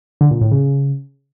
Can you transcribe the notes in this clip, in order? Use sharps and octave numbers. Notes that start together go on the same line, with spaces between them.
D3
A#2
A2
C#3